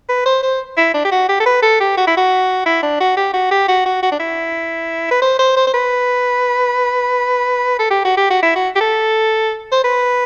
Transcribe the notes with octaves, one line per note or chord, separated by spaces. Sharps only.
B4
C5
C5
E4
D4
G4
F#4
G4
A4
B4
A4
G4
F#4
E4
F#4
E4
D4
F#4
G4
F#4
G4
F#4
F#4
F#4
D4
E4
B4
C5
C5
C5
C5
B4
A4
G4
F#4
G4
F#4
E4
F#4
G4
A4
C5
B4